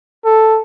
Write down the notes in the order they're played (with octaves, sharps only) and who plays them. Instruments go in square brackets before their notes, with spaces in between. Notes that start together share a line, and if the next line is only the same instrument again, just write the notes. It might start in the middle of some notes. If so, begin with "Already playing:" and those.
[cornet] A4